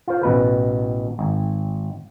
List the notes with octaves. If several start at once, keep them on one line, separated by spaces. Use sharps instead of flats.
F4 C5
A1 B2 B4
G#1